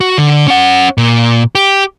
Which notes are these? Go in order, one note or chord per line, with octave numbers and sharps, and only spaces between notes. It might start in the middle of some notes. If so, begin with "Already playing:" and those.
F#4
D3
C#4 F#5
A#2
G4